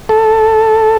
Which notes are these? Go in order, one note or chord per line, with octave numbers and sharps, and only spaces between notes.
A4